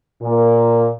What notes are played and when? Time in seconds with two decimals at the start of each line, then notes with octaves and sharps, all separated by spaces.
0.22 A#2 A#3